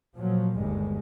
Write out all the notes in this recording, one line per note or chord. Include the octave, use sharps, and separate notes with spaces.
A#2 F3 F#3
G1 D#2 G3 G#3